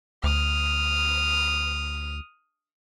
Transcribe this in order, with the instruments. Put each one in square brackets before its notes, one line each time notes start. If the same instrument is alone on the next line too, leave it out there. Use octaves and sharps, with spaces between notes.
[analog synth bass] D2 [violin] D#6 F6